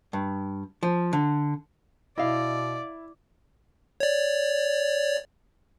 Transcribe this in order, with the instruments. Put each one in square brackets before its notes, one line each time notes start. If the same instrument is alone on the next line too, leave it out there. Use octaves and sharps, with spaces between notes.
[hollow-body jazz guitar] G2
F3
D3
[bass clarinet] B2 [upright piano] E4 [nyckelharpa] D5 [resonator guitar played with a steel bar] D#5 F5
[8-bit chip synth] C#5 D5